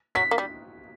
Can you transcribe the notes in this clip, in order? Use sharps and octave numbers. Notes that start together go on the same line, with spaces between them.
F#3 B6
A#3
G3